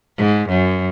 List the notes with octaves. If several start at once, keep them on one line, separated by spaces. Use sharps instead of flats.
G#2
F#2